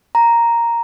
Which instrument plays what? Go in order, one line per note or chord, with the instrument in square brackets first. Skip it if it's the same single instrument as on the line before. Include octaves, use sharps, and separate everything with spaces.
[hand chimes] A#5